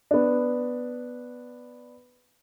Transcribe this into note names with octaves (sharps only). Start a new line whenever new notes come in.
B3 D4